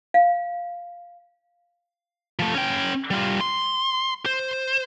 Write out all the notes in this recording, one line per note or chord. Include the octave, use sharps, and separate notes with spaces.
F5
F3 A3
C#4 G5
G3 F4
C6
C5